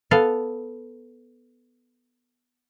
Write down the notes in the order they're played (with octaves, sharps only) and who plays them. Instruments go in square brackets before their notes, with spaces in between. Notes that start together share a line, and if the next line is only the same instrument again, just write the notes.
[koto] B3 A4 F5